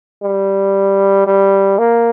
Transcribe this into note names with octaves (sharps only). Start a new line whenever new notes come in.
G3
G3
A#3